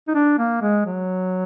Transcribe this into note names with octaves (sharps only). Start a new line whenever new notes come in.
D#4
D4
A#3
G#3
F#3